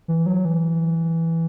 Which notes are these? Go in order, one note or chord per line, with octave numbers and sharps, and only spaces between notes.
E3
F#3
E3